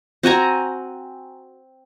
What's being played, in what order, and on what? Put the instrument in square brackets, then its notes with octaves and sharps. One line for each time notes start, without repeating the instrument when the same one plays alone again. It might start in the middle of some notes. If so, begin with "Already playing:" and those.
[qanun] C4 F#4 G#5 A#5